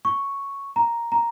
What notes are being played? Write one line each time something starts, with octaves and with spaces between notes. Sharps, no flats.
C#6
A#5
A#5